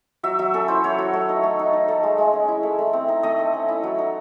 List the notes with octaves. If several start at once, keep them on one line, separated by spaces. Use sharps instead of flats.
F#3 E5
F#3 E5
C#4 A4
E4 C5
F#3 C#5
F#3
A3
D#4
A3
D#4
D#4
A3
G#3
G#3
C#4
E4
A3
A3
C4
D#4
A3 D#5
A3
C#4
E4
F#3
D#4